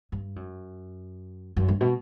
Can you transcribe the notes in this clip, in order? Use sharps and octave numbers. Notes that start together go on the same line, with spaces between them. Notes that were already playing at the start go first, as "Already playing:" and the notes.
G2
F#2
F#2
G2
B2